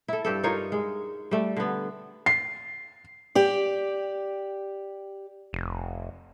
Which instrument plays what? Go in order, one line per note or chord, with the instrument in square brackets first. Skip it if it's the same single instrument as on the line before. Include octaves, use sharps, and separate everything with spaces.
[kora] E4 A4
G2 G4 A4
D#4 F4 A#4 C#5
G#3
G3 A3
D3 B3
[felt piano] C7
[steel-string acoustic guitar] G4 D5
[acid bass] F1